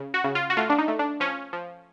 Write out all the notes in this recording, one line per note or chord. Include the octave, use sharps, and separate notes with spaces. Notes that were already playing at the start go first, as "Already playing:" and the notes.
Already playing: C#3
F#4
C#3
F4
F#4
A3 F4
D4
D#4
A3
D4
F3 C#4
F3